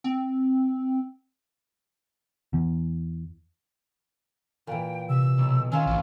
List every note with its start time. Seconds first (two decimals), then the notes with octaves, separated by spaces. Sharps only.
0.04 C4
2.53 E2
4.67 A#2 E3 G5
5.09 C3 E6
5.38 B1
5.72 D#3 C#4 F4 E6
5.86 A#1 G#2 E3